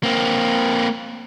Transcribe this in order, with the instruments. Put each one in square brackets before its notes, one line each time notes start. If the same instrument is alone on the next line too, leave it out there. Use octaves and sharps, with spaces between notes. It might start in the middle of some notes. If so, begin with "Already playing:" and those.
[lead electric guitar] A#3 C4